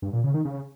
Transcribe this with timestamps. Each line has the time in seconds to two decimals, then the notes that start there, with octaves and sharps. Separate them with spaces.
0.02 G2
0.13 A#2
0.24 C#3
0.34 D#3
0.45 C#3